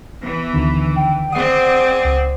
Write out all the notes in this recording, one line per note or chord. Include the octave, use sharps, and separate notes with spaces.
E3 B3
D2 D3 D#3
G5
C4 G#4 D5 F#5 D#6 C7
D#6
C#2